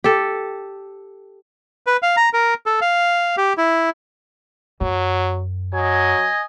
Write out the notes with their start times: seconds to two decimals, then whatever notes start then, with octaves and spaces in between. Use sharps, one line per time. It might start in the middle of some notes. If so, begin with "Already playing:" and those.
0.04 G4 A4
1.86 B4
2.02 F5
2.17 A#5
2.33 A#4
2.66 A4
2.81 F5
3.37 G4
3.57 E4
4.81 F#2 F#3
5.73 F#3 D#5 G#5